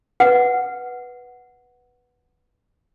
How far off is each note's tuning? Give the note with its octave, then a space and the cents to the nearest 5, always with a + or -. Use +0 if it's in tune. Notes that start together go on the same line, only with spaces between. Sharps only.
B4 -5 F#5 +0